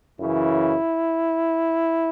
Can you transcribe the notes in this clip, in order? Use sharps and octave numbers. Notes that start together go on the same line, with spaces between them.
F#2 C#3 E3 E4